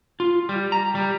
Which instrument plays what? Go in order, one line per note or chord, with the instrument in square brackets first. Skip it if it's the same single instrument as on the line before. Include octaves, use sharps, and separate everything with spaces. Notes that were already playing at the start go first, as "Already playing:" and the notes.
[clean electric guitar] F4
G3
A#5
G3